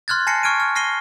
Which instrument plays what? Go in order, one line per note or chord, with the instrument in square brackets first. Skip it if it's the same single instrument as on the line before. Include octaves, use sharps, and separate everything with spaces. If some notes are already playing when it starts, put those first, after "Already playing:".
[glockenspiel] C6 F6 F#6 G#6 A6
G#5 A5 A#6 C7 C#7
C#6 F6 G#6 D7 D#7
F6
F6 A#6 C7 D#7 G7